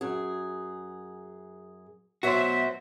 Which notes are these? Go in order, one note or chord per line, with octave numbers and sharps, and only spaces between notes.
F#2 G#4
B2 F#3 F#4 C5 E5